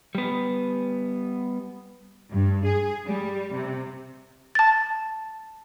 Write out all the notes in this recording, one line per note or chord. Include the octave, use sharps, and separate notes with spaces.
G3 B3
G2
G#4
G3
C3
A5 A6